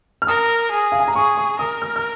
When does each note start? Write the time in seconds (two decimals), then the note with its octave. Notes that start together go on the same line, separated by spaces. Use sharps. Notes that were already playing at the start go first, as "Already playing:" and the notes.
0.22 F6
0.27 A#4 D#6
0.71 G#4
0.92 F5
1.00 G#5
1.08 A#5
1.15 G#4 C#6
1.37 C#6
1.59 A#4 D#6
1.82 F6
1.96 F6